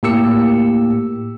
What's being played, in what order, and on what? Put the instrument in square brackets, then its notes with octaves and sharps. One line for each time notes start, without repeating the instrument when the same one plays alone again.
[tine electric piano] A2 A#3 G4 E6 C#7